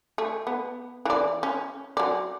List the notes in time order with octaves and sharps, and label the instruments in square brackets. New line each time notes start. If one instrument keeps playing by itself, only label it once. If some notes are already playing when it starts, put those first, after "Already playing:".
[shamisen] A3
B3
E3 D5
C#4
F#3 D5